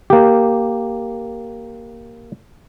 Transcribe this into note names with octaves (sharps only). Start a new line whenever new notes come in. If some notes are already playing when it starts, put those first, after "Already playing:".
A#3 G4